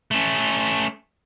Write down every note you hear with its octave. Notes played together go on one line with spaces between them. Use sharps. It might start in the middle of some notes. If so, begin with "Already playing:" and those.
A3 C#4